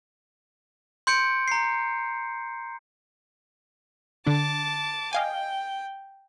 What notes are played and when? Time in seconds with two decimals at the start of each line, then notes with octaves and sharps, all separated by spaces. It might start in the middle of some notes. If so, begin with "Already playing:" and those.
1.07 C6 G6 C#7 D7
1.48 A#5 C7
4.27 D3 D4 A5 D6
5.13 D#5 F5 G5 G#5